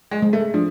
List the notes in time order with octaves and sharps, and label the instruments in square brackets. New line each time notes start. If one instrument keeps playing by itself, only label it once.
[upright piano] G#3
[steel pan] G#3
[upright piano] A3
[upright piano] F3 [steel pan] D4